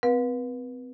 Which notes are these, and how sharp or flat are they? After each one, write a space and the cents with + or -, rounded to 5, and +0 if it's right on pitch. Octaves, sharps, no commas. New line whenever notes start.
C4 -35 B4 -30 F5 +40